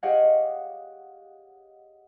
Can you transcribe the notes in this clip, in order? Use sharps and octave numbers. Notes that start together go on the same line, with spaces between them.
G4 G#4 C#5 D#5 F5 F#5